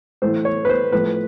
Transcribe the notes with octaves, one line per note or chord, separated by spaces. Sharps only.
A2 E3 A3 C5
C#5
B4
C5
A2 F3 A3 B4